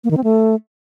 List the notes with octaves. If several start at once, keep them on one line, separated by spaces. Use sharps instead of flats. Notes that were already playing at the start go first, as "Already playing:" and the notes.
A#3
D#3
C4
A3